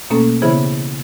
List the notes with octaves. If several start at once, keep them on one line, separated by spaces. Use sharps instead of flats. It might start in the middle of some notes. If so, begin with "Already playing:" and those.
B2 A3 A#3 C#4 A4
C#3 E3 B3 E4 G#4 C5